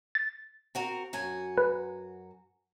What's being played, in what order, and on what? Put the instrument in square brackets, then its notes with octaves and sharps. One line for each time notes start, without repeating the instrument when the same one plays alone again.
[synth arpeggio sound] A6
[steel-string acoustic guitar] C4 F#4 A#4
F#2 F#4 G#5
[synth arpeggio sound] B4